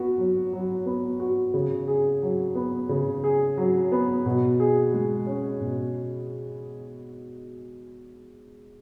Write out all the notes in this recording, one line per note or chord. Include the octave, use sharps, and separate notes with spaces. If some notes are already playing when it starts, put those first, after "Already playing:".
Already playing: B3 F#4
F#3
F#3
B3
F#4
C#3
G#4
F#3
B3
C#3
G#4
F#3
B3
B2
G#4
G#3
C#4
B2